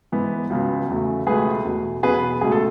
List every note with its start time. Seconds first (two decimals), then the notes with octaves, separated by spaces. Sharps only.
0.12 G#2 E3 B3
0.50 C#2 C#3 F#3 B3
0.89 E2 C#3 F#3 A3
1.27 C#2 B2 A3 G#4 B4
1.65 E2 B2 A3
2.03 E2 B2 F#3 B3 G#4 B4
2.41 C#2 B2 A3 G#4
2.52 A4